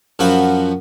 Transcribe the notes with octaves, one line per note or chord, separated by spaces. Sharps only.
F#2 F3 F#4 B5